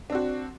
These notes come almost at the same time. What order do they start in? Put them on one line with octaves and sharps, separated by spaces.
D4 C4 F#4